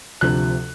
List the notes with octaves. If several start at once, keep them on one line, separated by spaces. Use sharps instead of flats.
D2 C3 F3 F#6